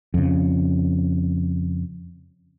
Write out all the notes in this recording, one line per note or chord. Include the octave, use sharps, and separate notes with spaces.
F2 C#3